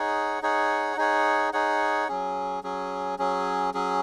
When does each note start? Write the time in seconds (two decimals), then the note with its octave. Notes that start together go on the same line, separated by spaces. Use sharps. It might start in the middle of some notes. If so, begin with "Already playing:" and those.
Already playing: D#4 G#4 C#5 F#5
0.42 D#4 G#4 C#5 F#5
0.97 D#4 G#4 C#5 F#5
1.53 D#4 G#4 C#5 F#5
2.08 F#3 C#4 G#4
2.63 F#3 C#4 G#4
3.19 F#3 C#4 G#4
3.74 F#3 C#4 G#4